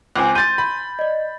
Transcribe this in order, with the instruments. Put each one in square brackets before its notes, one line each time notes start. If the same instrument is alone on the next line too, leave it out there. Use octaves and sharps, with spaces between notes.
[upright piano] C#2 C4 [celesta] G#5 D6 F#6
[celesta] C6 D#7 [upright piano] G6 A6
[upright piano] B5
[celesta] D5 D#5